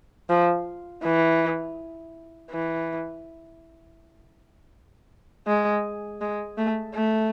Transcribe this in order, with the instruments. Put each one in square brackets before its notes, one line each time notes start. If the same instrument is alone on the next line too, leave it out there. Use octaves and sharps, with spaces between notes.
[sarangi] F3
E3
E3
G#3
G#3
A3
A3